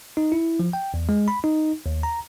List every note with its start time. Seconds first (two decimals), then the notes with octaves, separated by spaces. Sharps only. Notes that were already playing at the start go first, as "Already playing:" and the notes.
0.17 D#4
0.32 E4
0.59 F3
0.73 G5
0.94 E2
1.09 G#3
1.28 B5
1.44 D#4
1.86 D#2
2.03 A#5